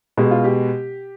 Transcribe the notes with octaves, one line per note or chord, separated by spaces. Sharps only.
B2 G#3 G4
F4
G4